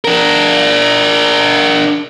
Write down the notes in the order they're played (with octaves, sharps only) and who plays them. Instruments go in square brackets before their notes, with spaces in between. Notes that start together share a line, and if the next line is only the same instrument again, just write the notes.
[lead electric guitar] D4 A#4